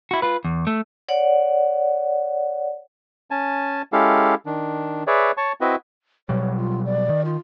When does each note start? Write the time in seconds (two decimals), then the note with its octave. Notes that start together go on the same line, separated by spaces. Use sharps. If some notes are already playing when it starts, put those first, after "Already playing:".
0.11 E4 F#4
0.22 F4 B4
0.45 E2
0.67 A3
1.09 C#5 D5 F#5
3.31 C#4 G#5 A5
3.93 G#3 C#4 E4 G4 A4 F5
4.46 D#3 D4
5.07 G#4 B4 C#5 D5 E5
5.37 C#5 A5 C#6
5.61 C4 E4 F#4 B4 D#5 E5
6.29 B2 F#3 G3 C#5
6.56 F4
6.85 D5
7.09 D#3
7.25 F4